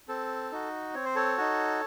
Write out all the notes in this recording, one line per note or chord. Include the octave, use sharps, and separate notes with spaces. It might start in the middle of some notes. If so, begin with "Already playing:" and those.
C4 A4
D#4 F#4
C4 C#5
C5
A4 C#5
D#4 F#4